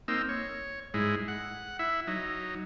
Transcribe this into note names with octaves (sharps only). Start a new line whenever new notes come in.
A#3 C4 D#4 E6
C#5
G#2 G#3 E4
F#5
E4 E5
F#3 D#4